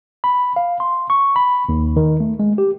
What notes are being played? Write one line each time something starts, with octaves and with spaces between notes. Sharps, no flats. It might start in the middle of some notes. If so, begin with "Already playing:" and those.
B5
F5
C6
C#6
B5
D#2
D#3
A3
G#3
G4